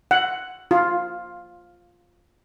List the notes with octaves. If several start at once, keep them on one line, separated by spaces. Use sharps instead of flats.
F#5
F4